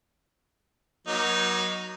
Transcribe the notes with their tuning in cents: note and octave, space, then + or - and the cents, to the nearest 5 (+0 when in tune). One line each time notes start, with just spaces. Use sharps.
F#3 +0 A#3 +40 D#4 +0